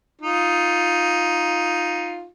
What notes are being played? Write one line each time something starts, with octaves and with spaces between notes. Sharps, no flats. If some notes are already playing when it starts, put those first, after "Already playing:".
D#4 F4